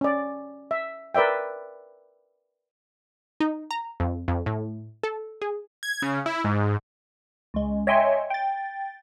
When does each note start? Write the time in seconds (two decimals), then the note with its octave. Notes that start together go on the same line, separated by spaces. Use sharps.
0.01 C#4 D5
0.71 E5
1.15 A#4 B4 D5 E5 G5
3.40 D#4
3.71 A#5
4.00 F2
4.28 F2
4.46 A2
5.03 A4
5.42 G#4
5.83 G#6
6.02 C#3
6.26 E4
6.44 G#2
7.54 C#2 G#3
7.87 C#5 D#5 E5 G5 G#5 C6
8.30 G5 A6